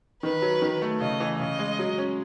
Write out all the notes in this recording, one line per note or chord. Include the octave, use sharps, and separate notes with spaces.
D#3 B4
F#3
D#3
A3
C#3 D#5
E3
C#3 D#5
G#3
F#3
C#4